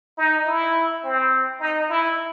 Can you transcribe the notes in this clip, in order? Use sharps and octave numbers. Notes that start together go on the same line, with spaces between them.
D#4
E4
C4
D#4
E4